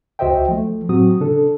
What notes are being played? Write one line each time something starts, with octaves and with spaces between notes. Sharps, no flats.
C#2 F#4 C5 D#5 E5 G5
F3 A3
A2 F#3 C4 F#4 D#6
C#3 D4 A4